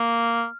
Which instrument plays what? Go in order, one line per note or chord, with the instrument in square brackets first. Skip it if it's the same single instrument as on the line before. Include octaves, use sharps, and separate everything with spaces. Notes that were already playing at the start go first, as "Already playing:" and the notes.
Already playing: [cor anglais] A#3 [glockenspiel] F6